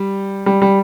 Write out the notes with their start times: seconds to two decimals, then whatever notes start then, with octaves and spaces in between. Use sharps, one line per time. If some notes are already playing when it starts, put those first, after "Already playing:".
Already playing: G3
0.46 G3
0.62 G3